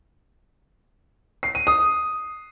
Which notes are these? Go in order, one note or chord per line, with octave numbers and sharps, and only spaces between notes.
C7
D#7
D#6